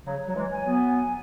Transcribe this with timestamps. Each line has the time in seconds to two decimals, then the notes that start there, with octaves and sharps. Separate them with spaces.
0.06 C#3 F#3 C#5
0.28 F#3
0.35 E3 G#3
0.50 G#5
0.65 F#3 B3
0.95 G#5